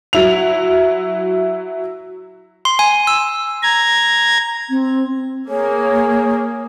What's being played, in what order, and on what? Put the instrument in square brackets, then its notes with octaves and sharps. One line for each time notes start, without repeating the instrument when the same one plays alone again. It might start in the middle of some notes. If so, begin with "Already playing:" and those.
[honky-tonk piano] F#3 E4 F7
[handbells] C6
G#5
E6
[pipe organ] A#5 G#6
[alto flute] C4
[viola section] A#3 [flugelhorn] G#4 [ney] C#5